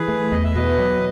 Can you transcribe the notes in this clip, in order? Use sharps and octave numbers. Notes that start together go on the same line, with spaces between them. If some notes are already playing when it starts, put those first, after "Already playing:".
Already playing: E3 G#4 B4
A3
E2 D#5
E5
B2 B4 D#5
F#3